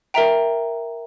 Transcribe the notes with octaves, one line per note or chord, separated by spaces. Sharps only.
A#4 E5 G5 A#5